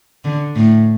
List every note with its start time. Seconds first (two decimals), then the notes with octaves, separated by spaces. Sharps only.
0.25 D3
0.56 A2